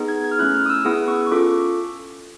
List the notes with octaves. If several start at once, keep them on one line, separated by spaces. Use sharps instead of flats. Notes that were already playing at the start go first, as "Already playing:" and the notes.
Already playing: B3 D#4 G#4
G#6
G#6
F6
A3 C#4 E4 F#6
F6
D#6
E6
B3 E4 G#4 D#6
C#6
C#6
C#4 F4 A4 D6